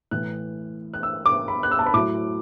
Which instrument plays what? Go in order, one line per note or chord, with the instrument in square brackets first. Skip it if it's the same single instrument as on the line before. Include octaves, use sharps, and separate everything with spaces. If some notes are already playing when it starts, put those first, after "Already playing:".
[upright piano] A2 E3 F#6
F#6
E6
D6
B5
F#6
E6
A5
B5
A2 F#3 D6